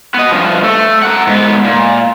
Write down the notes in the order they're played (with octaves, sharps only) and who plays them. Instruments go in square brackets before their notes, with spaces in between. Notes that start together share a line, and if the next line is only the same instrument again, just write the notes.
[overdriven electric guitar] B3 D#5
G2 F3
A3
A#4 F#5
G#2 B3
A#2